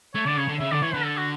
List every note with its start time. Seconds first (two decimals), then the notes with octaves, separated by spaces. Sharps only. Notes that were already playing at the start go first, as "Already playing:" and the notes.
0.15 A3 C#5
0.26 D3 D5
0.37 C#3 C#5
0.48 D3
0.60 C#3 E5
0.71 D3 D5
0.82 E3 C#5
0.94 D3 B4
1.05 A4
1.17 F#4